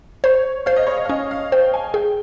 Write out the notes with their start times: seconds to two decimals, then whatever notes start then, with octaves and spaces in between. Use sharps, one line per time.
0.24 C5 C#5
0.66 C5 F5
0.76 D#5
0.86 C#5
0.97 D#5
1.05 F5
1.09 C#4 D#5
1.31 F5
1.52 C5 G5
1.73 G#5
1.94 G#4 G5